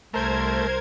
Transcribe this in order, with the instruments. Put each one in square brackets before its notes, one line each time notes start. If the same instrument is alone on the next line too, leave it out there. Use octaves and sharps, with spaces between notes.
[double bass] C2 [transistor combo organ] A3 [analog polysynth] A#4 C5 G#6